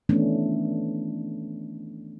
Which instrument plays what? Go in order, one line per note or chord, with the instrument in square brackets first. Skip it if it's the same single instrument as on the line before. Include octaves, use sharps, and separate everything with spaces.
[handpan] D#3 E3 A3 B3 C#4 D4